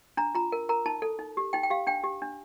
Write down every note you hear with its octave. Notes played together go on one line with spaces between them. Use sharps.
D4 A#5
F4 A#5
A#4
A#4 A#5
D#4 A5
A4
D#4
G4
D#4 G5
G5
G4 F5
D4 G5
G4
D4